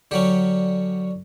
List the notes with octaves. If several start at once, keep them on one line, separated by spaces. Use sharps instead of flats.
D3 F#3 C#4 G4